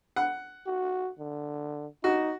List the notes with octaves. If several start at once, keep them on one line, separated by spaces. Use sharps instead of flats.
F#5
F#4
D3
D#4 F#4